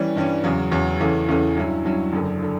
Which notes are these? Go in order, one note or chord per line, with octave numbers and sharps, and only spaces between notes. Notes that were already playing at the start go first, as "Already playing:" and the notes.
Already playing: E3 G3 C#4
G2 E3 G3 C#4
E2 C#3 F#3
E2 C#3 F#3
E2 C#3 E3 A3 C#4
E2 C#3 E3 A3 C#4
G2 F#3 C#4 E4
G2 F#3 C#4 E4
F#1 F#2 D3
D3